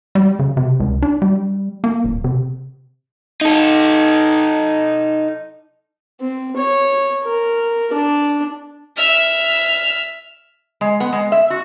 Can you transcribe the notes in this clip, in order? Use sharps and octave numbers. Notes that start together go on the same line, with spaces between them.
G3
C#3
C3
C#2
D4
G3
A#3
D#1
C3
D#4 A4
C4
C#5
A#4
D4
E5 F6
G#3
B3
G#3
E5
F#4